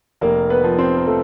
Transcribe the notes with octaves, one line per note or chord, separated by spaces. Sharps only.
F1 A#3 A#4
B3 B4
F3
C4 C5
A#4
F3 A3 A4